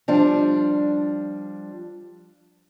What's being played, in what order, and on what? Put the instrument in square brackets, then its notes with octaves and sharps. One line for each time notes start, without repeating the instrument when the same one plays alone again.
[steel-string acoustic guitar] F3 G3 D4